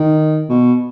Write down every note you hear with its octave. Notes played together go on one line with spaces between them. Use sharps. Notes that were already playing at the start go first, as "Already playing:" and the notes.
Already playing: D#3
B2